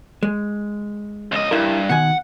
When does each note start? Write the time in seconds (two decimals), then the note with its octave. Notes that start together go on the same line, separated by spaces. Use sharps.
0.23 G#3
1.32 C#2 D#5
1.51 G2 E4 A#4
1.89 B2 D#3 F#5 G#5